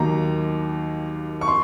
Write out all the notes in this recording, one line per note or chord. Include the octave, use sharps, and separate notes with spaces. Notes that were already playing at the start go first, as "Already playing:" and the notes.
Already playing: D#2 D#3 F#3 A#3 A#5
C#6
C6